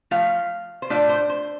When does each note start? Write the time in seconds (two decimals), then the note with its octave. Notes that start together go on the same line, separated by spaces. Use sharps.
0.11 F3 A3 F4 F5
0.82 C5
0.90 A2 A3 D4 F4 D5
1.09 C5
1.30 C5